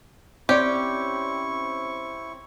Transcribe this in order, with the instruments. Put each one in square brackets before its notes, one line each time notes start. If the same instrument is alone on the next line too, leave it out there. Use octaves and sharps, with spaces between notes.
[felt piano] C4 [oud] C#4 C#5 D5 [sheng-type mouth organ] E4 C#6 [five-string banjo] G4